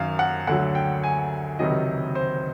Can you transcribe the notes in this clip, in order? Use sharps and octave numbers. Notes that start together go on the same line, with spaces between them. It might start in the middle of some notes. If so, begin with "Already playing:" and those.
Already playing: F#2 D#3 F#3 F5
F#5
D2 D3 F#3 F#5
G5
G#5
C#2 C3 D#3 F#3 D#5
C5